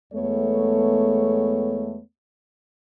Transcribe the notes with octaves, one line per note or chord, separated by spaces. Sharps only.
E2 G#3 A3 B3 A4 C#5